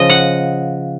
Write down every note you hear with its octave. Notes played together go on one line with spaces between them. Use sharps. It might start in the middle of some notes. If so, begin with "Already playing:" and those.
Already playing: C#3 F3 D#5
F#5